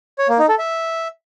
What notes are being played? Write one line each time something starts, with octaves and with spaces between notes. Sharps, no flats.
C#5
A#3
D#4
A4
E5